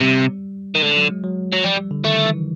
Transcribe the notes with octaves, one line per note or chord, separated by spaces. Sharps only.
C3 G3
D#3
D3 G#3
F#3
G#3
F#3
F#3
F3 G3
G3
D3
D#3 A3
E3